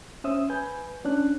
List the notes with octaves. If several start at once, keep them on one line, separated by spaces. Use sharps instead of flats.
C#4 C5 E5 D#6 E6
B4 G#5 G6
C#4 D4 F#6